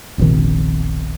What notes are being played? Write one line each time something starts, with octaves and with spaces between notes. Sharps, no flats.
E1 A#1 C3 D#3